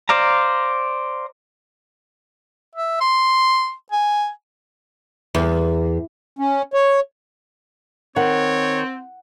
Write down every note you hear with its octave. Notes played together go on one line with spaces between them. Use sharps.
C5 D5 F5 A#5
E5
C6
G#5
E2
C#4
C#5
D#3 C4 C#5 F#5